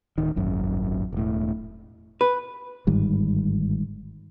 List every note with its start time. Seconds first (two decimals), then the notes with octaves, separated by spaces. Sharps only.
0.18 D1 D#3
0.36 D#1 G#1 F#2
1.13 E1 A2
2.21 B4
2.87 G1 G#2 D#3 G3